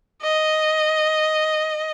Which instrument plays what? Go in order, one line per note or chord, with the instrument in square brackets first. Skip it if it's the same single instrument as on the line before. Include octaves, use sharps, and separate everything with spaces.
[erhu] D#5